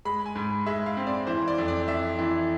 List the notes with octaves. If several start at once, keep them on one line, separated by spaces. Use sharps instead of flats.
G#3 B5
G#5
G#2
G#3 E5
F5
C4
D5
E3 C5
D5
F2
D5
F2 E5
E3